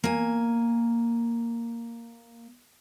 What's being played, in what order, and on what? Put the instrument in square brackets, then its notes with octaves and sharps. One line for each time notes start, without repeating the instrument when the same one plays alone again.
[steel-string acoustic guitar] A#3 G#5